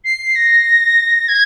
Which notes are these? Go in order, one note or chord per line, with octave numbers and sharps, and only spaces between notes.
C7
A#6
G#6